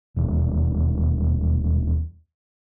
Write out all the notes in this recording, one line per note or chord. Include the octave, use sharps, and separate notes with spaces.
D#1 E2